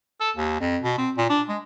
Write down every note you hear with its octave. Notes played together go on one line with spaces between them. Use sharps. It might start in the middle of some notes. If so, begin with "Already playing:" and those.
A4
D#2
F2
B2
C4
A#2
D4
G#3